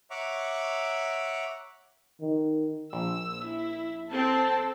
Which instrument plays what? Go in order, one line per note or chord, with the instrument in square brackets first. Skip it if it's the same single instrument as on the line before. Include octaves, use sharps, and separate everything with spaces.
[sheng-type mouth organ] C#5 E5 F#5 A#5 C#6 D6
[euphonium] D#3
[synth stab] A#1 [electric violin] E6
[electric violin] E4
[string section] C4 [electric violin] A4 [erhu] A5